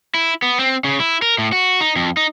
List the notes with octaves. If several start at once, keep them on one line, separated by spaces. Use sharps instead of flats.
E4
B3
C4
C#3
E4
A#4
A2
F#4
D#4
F2
D#4